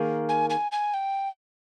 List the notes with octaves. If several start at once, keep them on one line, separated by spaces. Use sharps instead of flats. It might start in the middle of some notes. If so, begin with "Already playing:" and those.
Already playing: D#3 A#3 G#4
G#5
G#5
G#5
G5